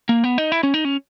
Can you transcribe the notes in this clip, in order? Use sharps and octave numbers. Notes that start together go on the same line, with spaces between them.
A#3
B3
D#4
E4
C#4
D#4
C#4